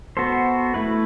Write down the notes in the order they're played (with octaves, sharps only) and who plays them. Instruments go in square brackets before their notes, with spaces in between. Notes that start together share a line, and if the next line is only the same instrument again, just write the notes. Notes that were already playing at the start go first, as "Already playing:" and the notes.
[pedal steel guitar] B3 F#4 A4 C5
A3 E4 B4